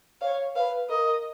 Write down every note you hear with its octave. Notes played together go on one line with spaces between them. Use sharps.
C#5 F5
B4 F5
A#4 D#5